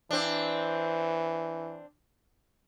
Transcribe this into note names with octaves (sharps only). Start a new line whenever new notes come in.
E3 C4 D4